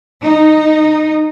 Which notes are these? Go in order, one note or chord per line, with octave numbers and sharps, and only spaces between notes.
D#4